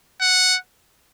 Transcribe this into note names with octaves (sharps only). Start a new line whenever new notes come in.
F#5